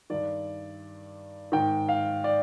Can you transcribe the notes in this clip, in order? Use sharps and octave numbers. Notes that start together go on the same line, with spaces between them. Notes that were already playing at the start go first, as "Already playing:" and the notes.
G2 D#3 D5
G#2 D#3 G5
F5
D5